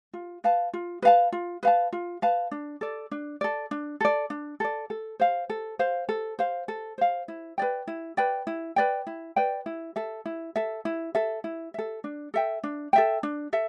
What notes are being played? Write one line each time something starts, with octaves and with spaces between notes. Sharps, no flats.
F4
B4 F5 A5
F4
B4 F5 A5
F4
B4 F5 A5
F4
B4 F5 A5
D4
A4 D5
D4
A4 D5
D4
A4 D5
D4
A4 D5
A4
C5 F5
A4
C5 F5
A4
C5 F5
A4
C5 F5
E4
B4 D5 G5
E4
B4 D5 G5
E4
B4 D5 G5
E4
B4 D5 G5
E4
A4 E5
E4
A4 E5
E4
A4 E5
E4
A4 E5
D4
A4 E5 G5
D4
A4 E5 G5
D4
A4 E5